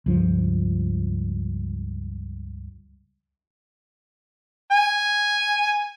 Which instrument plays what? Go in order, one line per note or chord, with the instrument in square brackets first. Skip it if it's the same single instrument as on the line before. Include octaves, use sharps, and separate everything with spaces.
[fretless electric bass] C#2 G2 F3
[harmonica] G#5